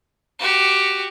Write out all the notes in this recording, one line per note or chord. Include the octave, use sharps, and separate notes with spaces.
F#4 G4